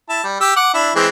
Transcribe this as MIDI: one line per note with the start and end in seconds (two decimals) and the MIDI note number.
0.09 0.24 64
0.09 0.24 81
0.24 0.38 55
0.41 0.54 67
0.41 0.54 88
0.56 0.70 78
0.56 0.70 86
0.74 0.91 62
0.74 0.91 64
0.95 1.08 52
0.95 1.08 56
0.95 1.08 60